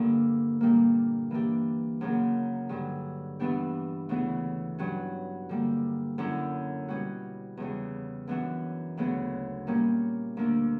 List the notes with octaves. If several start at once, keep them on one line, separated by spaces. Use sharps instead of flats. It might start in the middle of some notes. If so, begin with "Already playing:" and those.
Already playing: G2 D3 G3 A#3
A#2 G3 A#3
E3 A#3 D4 G4
F#2 C#3 F#3 A#3
G2 D3 F#3
G2 E3 B3 D4 G4
D2 C#3 E3 B3 E4
G2 F#3 C#4 F#4
D3 G3 A#3
F#2 D3 F#3 C#4 E4
B2 G3 C#4 F#4
E2 C#3 G3
F#2 E3 B3 D4 F#4
D2 C#3 F#3 B3 F#4
A#2 G3 A#3 C#4
D2 D3 A#3 D4